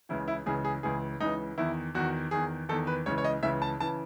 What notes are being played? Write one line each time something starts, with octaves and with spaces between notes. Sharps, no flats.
C#2 C#3 E3 E4
E4
C#2 C#3 E3 G#4
G#4
C#2 C#3 E3 G#4
C#2 C#3 E3 D#4
E2 D#3 E4
E2 D#3 F#4
E2 D#3 G#4
E2 D#3 A4
B4
C#2 C#3 E3 C#5
C#5
D#5
C#2 C#3 E3 E5
A5
C#3 E3 A5